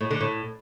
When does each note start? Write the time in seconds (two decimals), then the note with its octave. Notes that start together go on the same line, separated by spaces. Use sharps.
0.01 A2
0.11 D3
0.21 A2